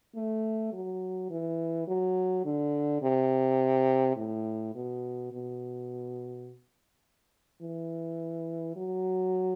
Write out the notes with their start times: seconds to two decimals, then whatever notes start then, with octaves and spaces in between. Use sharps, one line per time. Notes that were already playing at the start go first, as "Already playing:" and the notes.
0.15 A3
0.73 F#3
1.30 E3
1.87 F#3
2.45 D3
3.02 C3
4.17 A2
4.75 B2
5.32 B2
7.62 E3
8.76 F#3